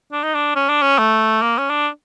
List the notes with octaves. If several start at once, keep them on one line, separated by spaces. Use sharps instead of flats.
D4
D#4
D4
C#4
D4
C#4
A3
A#3
C#4
D4